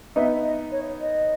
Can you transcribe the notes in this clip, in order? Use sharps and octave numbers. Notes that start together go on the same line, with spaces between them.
B3 D#4 E5
D#5
C#5
D#5